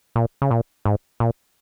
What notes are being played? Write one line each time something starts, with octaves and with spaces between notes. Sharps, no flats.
A#2
C#3
A#2
G#2
A#2